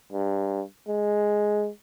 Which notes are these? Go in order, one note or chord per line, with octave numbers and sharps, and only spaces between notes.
G2
G#3